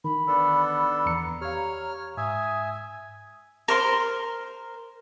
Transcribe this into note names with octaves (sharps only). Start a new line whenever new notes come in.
D#3 B5
B3 D4 A4
E2 A#5 C#7
G4 C#5 F5 F6
G#2 E5 G#5 D#6
A#4 C5 C6